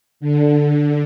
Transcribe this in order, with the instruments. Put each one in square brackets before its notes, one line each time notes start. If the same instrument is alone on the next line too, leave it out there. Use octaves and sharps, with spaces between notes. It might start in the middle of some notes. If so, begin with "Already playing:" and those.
[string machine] D3